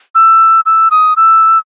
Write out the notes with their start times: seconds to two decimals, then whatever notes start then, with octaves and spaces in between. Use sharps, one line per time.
0.15 E6
0.66 E6
0.91 D#6
1.17 E6